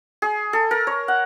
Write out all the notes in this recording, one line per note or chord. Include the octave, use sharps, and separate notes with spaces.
G#4
A4
A#4
C#5
F#5